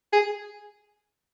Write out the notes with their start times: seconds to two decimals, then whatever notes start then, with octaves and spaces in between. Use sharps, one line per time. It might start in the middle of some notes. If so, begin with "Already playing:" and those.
0.13 G#4